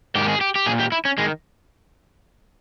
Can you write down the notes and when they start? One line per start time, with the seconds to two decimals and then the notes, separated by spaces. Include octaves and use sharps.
0.15 G#2 D#3 G4
0.28 G#4
0.41 G4
0.56 G4
0.66 A#2 G#4
0.79 G4
0.92 E4
1.05 C#4
1.18 D#3 G#3